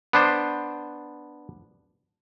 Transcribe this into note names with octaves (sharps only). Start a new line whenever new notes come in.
B3 D4 C5